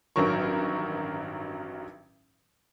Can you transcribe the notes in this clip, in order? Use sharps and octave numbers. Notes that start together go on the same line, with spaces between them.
A1 G2 D#3 F#3 A#4 C#6